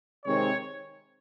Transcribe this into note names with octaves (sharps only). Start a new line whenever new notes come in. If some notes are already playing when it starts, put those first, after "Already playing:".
C3 D#3 G#3 C4 C#5